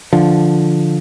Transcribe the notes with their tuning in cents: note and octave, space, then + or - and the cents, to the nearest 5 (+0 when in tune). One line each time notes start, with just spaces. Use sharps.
D3 +0 F3 +0